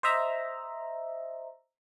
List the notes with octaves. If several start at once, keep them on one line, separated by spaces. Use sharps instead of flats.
C5 D#5 E5 A#5